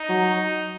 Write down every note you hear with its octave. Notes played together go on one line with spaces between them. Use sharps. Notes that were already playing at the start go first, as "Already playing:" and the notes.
Already playing: D#4
F#3